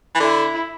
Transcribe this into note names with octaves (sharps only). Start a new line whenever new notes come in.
E3
D3 E4